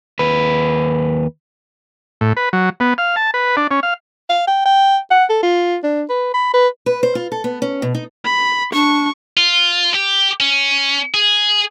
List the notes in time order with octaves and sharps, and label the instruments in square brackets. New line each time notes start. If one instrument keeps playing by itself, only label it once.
[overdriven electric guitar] D#2 B4
[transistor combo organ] A2
B4
F#3
B3
F5
A5
B4
D4
C#4
F5
[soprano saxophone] F5
G5
G5
F#5
A4
F4
D4
B4
B5
B4
[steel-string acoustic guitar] B4
C5
F4
A4
B3
C#4
B2
D#4
[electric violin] B5
[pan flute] D4 [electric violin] C#6
[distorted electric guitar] F4
G4
C#4
G#4